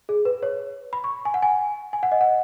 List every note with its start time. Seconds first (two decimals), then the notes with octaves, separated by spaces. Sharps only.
0.09 G#4
0.25 B4
0.43 C#5
0.93 B5
1.04 C#6
1.25 G#5
1.34 F#5
1.42 G#5
1.93 G#5
2.03 F#5
2.12 D#5
2.21 F#5